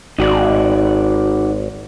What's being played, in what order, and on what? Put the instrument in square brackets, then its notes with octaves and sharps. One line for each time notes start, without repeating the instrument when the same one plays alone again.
[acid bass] G#1 [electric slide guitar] D#4 F#4 D5